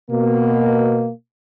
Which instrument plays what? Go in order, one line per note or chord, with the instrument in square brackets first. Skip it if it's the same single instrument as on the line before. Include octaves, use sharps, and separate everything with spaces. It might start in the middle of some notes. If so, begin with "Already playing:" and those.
[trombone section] B2 A#3